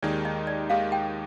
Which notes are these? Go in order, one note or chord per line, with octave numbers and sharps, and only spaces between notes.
D#2 D#3 G#3 D#4 G4 D5
D#5
D5
D#2 D#3 G#3 D#4 G4 F5
G5